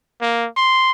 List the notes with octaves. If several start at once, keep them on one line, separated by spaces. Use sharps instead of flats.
A#3
C6